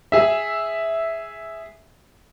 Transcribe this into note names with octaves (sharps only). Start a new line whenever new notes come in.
G#4 E5